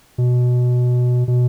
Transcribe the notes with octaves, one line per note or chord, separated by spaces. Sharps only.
B2
B2